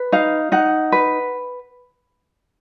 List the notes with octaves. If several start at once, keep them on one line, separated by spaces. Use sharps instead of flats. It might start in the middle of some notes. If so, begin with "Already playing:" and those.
Already playing: B4
D#4 F5
D#4 F#5
B4